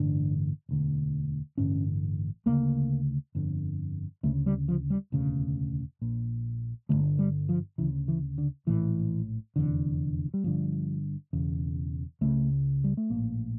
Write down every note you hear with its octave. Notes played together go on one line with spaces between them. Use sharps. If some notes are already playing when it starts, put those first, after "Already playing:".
Already playing: A1 G2 D3 D4
E1 D2 D3
A1 G2 D3 C#4
D2 C#3 A#3
G1 F2 D3
D2 C#3 A3
G3
F3
G3
E1 D2 C#3
A#1 A#2
G1 F2 D3 A3
G3
F3
D2 C#3 E3
E3
D3
A#1 A2 E3
F1 E2 D3
G3
G1 G2 D3 F3
E1 E2 C#3
C#2 C#3 A3
G3
A3
A#1 A2 A#3